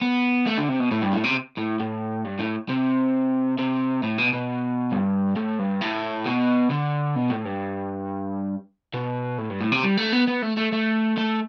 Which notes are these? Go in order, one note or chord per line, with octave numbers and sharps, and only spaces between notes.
B3
A3
D3
C3
B2
A2
G2
A2
C3
A2
A2
G2
A2
C3
C3
A2
B2
B2
G2
A2
G2
A2
B2
D3
B2
A2
G2
B2
A2
G2
A2
C3
G3
A3
B3
B3
A3
A3
A3
A3